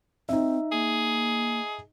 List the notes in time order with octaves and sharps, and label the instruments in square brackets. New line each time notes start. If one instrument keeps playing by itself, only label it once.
[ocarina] C4 [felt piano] D#4 E5
[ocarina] A#3 [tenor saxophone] G#4